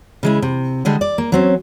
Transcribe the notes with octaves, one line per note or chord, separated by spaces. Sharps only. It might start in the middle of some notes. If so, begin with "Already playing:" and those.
C#3 G#3 E4
C3
D3 G3 G#3 G#4
D5
A#3
F#3 C4 C#4